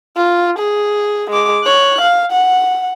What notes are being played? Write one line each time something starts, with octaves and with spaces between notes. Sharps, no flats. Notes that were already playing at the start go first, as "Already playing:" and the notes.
F4
G#4
G#3 D6
C#5 F#6
F5
F#5